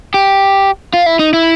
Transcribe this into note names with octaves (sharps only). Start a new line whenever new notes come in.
G4
F4
E4
D#4
E4